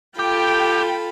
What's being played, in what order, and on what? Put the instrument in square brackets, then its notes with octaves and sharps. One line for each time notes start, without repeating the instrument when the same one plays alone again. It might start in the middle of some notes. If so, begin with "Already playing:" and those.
[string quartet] F4 A4 B5 [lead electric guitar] G4 [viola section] G5